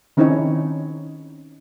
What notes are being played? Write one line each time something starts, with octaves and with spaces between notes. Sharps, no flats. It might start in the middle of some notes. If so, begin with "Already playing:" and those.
D#3 C4 C#4 D#4 E4 C#5